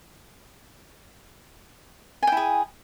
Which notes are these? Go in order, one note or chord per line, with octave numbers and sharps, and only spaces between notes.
E4 G#4 G5 G#5